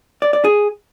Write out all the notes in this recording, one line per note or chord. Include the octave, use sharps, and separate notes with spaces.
D5
D5
G#4